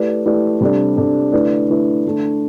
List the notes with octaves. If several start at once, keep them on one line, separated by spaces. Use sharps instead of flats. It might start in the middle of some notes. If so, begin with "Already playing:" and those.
Already playing: A3 E4 G4 B4 D5
A3 E4 G4 B4 D5
C3 G3 D4 A4 D5
C3 G3 D4 A4 D5
D3 A3 E4 B4 D5
D3 A3 E4 B4 D5
D3 A3 D4